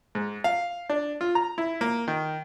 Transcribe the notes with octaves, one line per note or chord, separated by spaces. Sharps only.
G#2
F5
D4
F4
A#5
E4
A#3
D#3